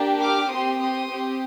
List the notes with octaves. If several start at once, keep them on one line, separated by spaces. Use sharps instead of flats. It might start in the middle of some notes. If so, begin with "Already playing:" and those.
Already playing: A#3 D4 G4
D6 F6
C4 G4 C6 D#6
C6 D#6
C4 G4